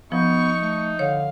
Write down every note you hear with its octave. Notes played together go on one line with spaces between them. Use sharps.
F3 B3 D#4 C#6
A3
D3 C#5 F5